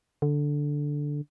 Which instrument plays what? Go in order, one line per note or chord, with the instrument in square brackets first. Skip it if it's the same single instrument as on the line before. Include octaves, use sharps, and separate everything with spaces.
[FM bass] D3